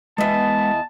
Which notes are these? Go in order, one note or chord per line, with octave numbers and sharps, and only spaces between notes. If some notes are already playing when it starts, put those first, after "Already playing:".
E2 G#3 B3 D#5 E5 A5